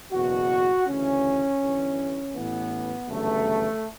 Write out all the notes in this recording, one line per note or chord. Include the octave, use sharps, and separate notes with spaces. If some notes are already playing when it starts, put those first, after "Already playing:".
F#1 E2 B2 F#4
D2 C#3 E3 C#4
G1 G2 E3
A1 A2 E3 B3
G1 F#2 C#3 E3 A3